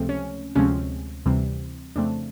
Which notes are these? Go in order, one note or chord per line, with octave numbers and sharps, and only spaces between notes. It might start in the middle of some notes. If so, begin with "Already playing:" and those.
Already playing: C#2 C3 F3 A3 C4
C#4
D2 C3 F3 G#3 C4 C#4
D2 C3 E3 G3 C4
F2 C#3 F3 A3 C4 D4